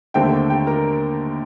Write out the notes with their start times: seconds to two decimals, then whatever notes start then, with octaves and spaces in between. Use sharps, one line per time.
0.14 D#2 D3 A3 C4 G4 G5
0.50 G4 G5
0.67 A#4 A#5